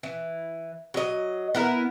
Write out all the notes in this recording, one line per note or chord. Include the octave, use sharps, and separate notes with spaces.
E3
F#3 D#5
B3 E4 A#4